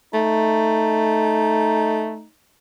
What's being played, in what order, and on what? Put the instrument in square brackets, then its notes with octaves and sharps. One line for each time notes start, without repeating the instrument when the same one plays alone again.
[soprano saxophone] A3 [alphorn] D#4